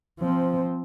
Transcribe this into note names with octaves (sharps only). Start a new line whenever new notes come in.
F3 C4